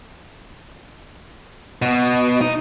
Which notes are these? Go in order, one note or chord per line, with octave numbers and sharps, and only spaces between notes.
B2
D#4